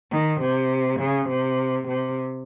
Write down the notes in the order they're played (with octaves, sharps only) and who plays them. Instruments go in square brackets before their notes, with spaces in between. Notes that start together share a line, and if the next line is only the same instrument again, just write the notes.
[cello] D#3
C3
C#3
C3
C3